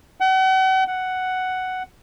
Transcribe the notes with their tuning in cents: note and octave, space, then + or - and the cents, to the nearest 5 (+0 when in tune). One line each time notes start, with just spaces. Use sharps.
F#5 +40
F#5 +5